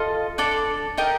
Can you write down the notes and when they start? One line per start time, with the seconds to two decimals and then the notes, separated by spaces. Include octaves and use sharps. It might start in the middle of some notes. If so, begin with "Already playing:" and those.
Already playing: F4 A4 D#5
0.38 D4 A4 D5
0.97 D#4 G4 A#4 D#5